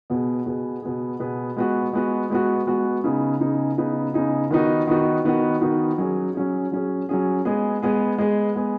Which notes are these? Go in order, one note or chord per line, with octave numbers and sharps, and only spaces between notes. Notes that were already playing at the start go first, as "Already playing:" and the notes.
B2 B3 G#4
B2 B3 G#4
B2 B3 G#4
B2 B3 G#4
G#3 B3 F#4
G#3 B3 F#4
G#3 B3 F#4
G#3 B3 F#4
C#3 B3 D#4 G#4
C#3 B3 D#4 G#4
C#3 B3 D#4 G#4
C#3 B3 D#4 G#4
D#3 B3 D#4 F#4
D#3 B3 D#4 F#4
D#3 B3 D#4 F#4
D#3 B3 D#4 F#4
F#3 C#4 G#4
F#3 C#4 G#4
F#3 C#4 G#4
F#3 C#4 G#4
G#3 B3 G#4
G#3 B3 G#4
G#3 B3 G#4
G#3 B3 G#4